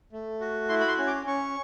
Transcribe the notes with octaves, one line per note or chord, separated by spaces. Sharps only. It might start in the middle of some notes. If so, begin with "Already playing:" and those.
A3
F#4
E4 C6
B5
C6
C#4
D6
C#4 C#6